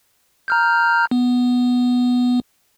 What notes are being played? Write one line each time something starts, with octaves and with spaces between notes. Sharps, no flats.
A#5 F6 G6
B3